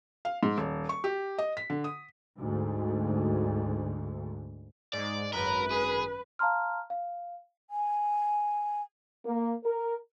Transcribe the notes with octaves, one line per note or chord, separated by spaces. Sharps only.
F5
G#2
D#1
C#6
G4
D#5
B6
D3
D#6
D2 G#2
G#2 G#3 D5
G#1 F#2 A#4 B4 B5
G#4
F5 A5 A#5 C6 F6
F5
G#5
A#3
A#4